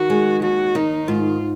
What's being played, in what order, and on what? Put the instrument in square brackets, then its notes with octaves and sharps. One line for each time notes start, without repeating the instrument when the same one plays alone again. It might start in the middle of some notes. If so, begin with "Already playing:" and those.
Already playing: [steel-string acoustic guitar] D#3 [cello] F#4
[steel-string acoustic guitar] G#3
[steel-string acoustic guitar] D#2 [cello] F#4
[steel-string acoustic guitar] D#3 [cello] D#4
[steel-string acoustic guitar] G#2 [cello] F4